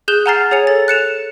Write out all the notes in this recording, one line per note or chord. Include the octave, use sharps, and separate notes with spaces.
G#4 F#6 G6 E7 G7
F#5 G#5 A#5 F6 A6 C7
G#4 C#5 G#5 C#7 F7
A4 A6
F#6 C#7 E7 F7